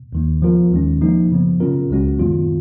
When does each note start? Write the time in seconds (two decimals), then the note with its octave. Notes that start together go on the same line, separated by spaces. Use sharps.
0.13 D#2 D#3 A#3
0.42 F3 B3 F4 A#4
0.71 D#2 D#3 G#3 C#4
1.01 F3 A#3 D#4
1.31 F#2 C#3 F3 B3
1.60 C#3 F#3 C#4 F4 A#4
1.90 C#2 C#3 G#3 C#4 F#4
2.19 F#2 D#3 F#3 B3 F4